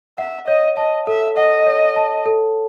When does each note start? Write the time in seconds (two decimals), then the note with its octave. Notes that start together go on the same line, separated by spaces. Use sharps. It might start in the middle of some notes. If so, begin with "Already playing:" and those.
0.18 E5 F#5
0.47 C#5 D#5
0.77 D#5 A5
1.07 A4 E5
1.37 D#5 F#5
1.67 C#5
1.96 A5
2.26 A4